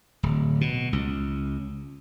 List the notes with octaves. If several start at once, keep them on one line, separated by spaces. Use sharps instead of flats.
D1
B2
C#2